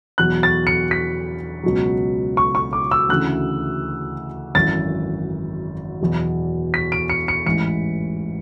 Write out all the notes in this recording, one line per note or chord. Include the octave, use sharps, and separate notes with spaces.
E2 B2 F#3 F#6
A6
C#7
B6
C#2 B2 F#3
C#6
C#6
D6
E6
D2 C#3 E3 F#6
G#1 F#2 E3 A6
E2 B2 F#3
B6
D7
C#7
C#7
A1 G#2 E3 C#7